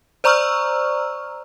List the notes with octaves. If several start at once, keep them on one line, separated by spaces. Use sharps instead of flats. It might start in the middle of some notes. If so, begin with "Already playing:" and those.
C5 D5 A#5 C#6 E6 F6